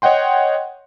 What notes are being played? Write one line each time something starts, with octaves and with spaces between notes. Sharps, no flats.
C#5 D#5 F#5 G5 C6